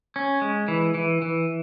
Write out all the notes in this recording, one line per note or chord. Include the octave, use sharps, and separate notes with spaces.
C#4
G#3
E3
E3
E3